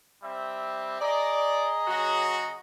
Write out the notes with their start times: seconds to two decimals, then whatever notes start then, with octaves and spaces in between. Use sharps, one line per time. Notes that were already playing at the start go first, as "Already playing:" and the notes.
0.23 G3 C4 E5
1.01 G#4 D5 D#5 A#5
1.87 C#3 F#3 F#4